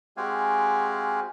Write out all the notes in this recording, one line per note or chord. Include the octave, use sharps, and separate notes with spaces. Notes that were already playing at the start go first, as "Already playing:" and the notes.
G#3 C4 F#4 G4 F5 G#5